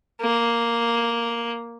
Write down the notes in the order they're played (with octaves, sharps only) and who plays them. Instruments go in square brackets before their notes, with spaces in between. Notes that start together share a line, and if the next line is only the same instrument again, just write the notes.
[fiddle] A#3